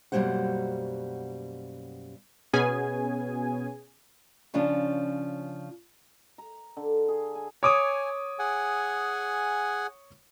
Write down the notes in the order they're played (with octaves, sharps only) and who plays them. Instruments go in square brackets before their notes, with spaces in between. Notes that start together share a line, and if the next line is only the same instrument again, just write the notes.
[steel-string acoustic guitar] F#2 B2 G3 A#3 C5 F#5
[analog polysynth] B2 B3 C#4 G#4 G#5
[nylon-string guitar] C#3 F3 C#4 D4
[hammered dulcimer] A#5
D3
G#4
G#5
[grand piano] C#5 D6 D#6 [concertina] G#5
[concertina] G#4 F#5 G#5